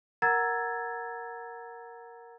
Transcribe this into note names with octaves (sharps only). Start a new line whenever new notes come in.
A#4 F#5 A#5 E6 G#6 A6